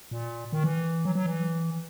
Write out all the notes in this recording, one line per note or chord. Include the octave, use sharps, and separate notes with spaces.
A#2
D#3
E3
F#3
F#3
E3